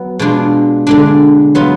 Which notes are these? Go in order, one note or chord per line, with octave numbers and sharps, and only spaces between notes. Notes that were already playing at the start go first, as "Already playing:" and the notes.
Already playing: F#3 B3
B2 G#3 D4 F4
D3 G#3 D4
F#3 B3 F4